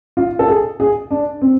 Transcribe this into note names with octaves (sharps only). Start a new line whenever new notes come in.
F4
A4
G#4
G#4
D4
C4